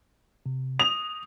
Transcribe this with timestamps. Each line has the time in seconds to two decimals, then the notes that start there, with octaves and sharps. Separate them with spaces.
0.46 C3
0.79 D#6 F7